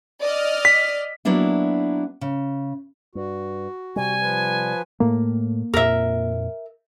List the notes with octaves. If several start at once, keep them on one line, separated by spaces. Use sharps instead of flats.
D5 D#5 F6
B6
F#3 A#3 B3 D4 E4
C#3
G2 F#4
C3 G3 G#5
F3 B4
A2 A3 A#3
F2 A#2 A#4 E5